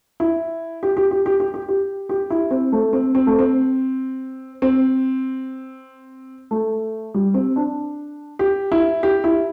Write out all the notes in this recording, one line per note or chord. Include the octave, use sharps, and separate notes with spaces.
E4
G4
G4
G4
G4
G4
G4
G4
G4
E4
C4
A3
C4
C4
A3
C4
C4
A3
G3
C4
D4
G4
E4
G4
E4